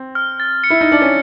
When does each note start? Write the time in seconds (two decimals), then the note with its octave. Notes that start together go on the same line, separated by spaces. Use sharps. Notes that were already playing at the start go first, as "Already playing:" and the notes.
Already playing: C4
0.15 F6
0.40 A6
0.64 C#7
0.70 E4
0.81 D#4
0.88 D4 C#7
1.02 C#4